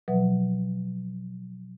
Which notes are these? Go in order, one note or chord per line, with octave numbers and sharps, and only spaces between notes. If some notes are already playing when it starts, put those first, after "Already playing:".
B2 F3 F#3 B4 E5 F#5